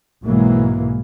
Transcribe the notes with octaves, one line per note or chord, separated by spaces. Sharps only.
B1 G#2 E3 F#3 G#3 A#3